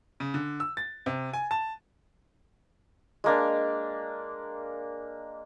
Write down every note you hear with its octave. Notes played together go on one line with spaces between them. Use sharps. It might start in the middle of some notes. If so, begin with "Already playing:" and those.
C#3
D3
E6
A6
C3
G#5
A5
G#3 A#3 D4